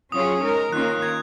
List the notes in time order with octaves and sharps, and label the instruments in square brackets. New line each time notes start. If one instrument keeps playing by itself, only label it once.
[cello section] F#3 C#4 F4 G#4 C#5 [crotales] D#6
[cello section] G#3 D#4 A#4
[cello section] D#3 A#3 C#4 F4 A#4 [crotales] F#6
[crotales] G#6